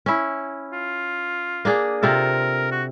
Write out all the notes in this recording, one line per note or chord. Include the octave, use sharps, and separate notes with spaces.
C#4 E4
F4
A#3 D4 G#4
C3 F4 A4 A#4
F#4